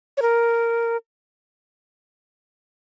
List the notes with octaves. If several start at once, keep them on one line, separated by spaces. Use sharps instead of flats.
C#5
A#4